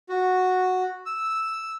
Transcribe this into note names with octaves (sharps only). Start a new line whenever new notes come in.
F#4
E6